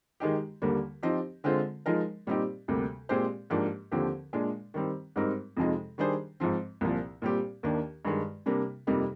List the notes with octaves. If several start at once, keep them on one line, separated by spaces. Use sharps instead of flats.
D#3 G#3 D#4 G4
D#2 D3 G3 A#3
F3 C4 D#4 G4
D3 G#3 C4 F4 C5
F3 G#3 D#4 A#4
A#2 G3 C4 D#4 G4
D2 C3 G3 A#3
A#2 G#3 C4 G4 C5
G#2 F3 A#3 D4 G4
D#2 D3 F3 C4 G4
A#2 G#3 D4
D#3 G3 C4
G#2 G3 C4 D#4 A#4
F2 C3 F3 G#3 D#4
D#3 G3 D4 G#4 C5
G#2 F3 C4
C2 A#2 F3
A#2 G3 C4 G4
D#2 D#3 A#3 D4
G2 D#3 G#3
C3 G3 A#3 D4
F2 C3 G3 A#3 D#4